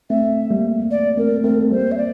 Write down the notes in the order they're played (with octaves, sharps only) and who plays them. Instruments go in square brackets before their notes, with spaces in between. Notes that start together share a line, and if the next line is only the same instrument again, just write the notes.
[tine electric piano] A3 C4 [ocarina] E5
[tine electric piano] G3 A#3
[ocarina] D5
[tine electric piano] A3 C4 [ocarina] A#4
[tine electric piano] A3 C4 [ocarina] A#4
[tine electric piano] C4
[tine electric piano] G3 A#3 [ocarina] C5
[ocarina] E5
D5